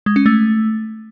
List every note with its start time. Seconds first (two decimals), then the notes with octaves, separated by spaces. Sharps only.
0.06 G#3
0.16 C#4
0.26 A3